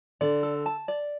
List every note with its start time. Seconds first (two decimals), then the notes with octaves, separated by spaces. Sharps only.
0.21 D3 D5
0.43 A4
0.66 A5
0.88 D5